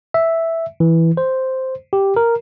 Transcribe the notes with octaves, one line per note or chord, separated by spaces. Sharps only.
E5
E3
C5
G4
A#4